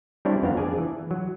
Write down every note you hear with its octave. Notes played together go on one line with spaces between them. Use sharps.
G3 C4 D4 E4 C#5
F2 B3 C4 F5 A#5
D4 G#4 D5 G#5
E3
F#3